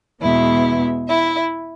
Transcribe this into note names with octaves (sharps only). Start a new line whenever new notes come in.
E2 B2 G#3 B3 E4 E5
E4 E5